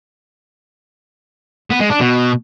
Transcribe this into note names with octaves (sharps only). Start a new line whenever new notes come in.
B3
G#3
D4
B2